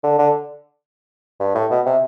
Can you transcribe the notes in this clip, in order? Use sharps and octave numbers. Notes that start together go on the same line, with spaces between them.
D3
D3
G2
A2
B2
C3